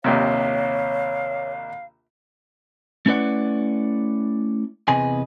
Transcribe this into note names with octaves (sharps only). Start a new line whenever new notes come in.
A#1 D#2 C3 C#5 F5
A3 C#4 E4 B4 D5 F#5
E2 C3 G#4 B4 D#5 G#5